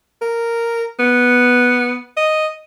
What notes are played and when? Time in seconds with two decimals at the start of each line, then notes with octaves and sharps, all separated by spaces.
0.21 A#4
0.99 B3
2.17 D#5